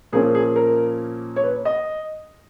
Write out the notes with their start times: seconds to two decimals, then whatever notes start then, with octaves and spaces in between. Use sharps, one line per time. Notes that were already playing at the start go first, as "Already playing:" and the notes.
0.13 A#2 F3 A#3 C#4 G#4
0.35 G#4
0.56 A#4
1.36 C#5
1.43 B4
1.65 D#5